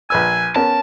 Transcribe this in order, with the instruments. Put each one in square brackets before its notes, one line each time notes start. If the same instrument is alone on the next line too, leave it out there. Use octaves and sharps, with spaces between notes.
[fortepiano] A#1 B4 E6 [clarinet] G#5
[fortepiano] B3 C#4 A#4 [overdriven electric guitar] A5